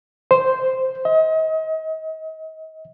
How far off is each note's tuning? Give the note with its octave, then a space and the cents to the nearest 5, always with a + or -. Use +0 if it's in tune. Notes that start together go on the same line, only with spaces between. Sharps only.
C5 +0
D#5 +35